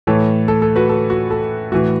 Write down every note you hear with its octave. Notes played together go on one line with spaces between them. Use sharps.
A2 E3 A4 C#5
A4
A4
F#4 B4
A4
F#4
A4
A2 E3 F#4